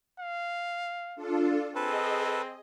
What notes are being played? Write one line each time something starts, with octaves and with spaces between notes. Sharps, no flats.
F5
D4 F4 A4
C4 G#4 A4 B4 D#5